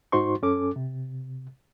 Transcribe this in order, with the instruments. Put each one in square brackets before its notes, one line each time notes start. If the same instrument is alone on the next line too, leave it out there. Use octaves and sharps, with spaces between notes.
[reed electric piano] G#2 D#4 F#4 C5 C6 C#6
F#2 C#4 A4 D6
C3